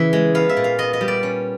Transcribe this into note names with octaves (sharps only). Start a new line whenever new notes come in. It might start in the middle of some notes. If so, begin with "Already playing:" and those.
Already playing: C#3 E3 E5
G#3
B3 F5
E5
A#2
F5
B3 D#5
D#5
G3
D5
C#4